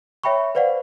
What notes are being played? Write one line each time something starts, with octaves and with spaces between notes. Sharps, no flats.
C#5 E5 G5 B5 C#6
B4 C5 D5 F5 F#5